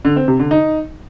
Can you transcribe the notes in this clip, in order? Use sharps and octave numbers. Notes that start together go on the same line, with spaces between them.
D3
C4
C3
D3
D#4